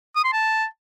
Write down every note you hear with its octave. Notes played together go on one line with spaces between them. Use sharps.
D#6
C6
A5